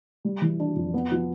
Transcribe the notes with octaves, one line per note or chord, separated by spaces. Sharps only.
G3
E3
D4
F2
B3
F3